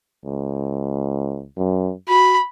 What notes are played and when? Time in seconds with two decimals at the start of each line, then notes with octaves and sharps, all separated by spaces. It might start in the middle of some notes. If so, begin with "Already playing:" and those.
0.25 C#2
1.57 F#2
2.09 F#4 B5